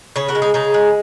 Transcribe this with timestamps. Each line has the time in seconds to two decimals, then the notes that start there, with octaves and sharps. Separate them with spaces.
0.16 C#3 G#4 C#5
0.28 F#4 A#4
0.35 G#3
0.42 D#4 G#4
0.54 C#3 D#4 G#4
0.74 G#3